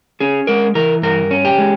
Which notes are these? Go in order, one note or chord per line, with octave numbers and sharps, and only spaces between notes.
C#4 G#4
G#3 A#4
E3 A#4
G2 A#4
C#4
G4
G#3